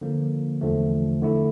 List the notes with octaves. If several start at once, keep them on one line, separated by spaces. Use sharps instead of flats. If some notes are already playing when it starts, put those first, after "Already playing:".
D3 F3 A#3
E2 D3 F3 A3
D3 A3 E4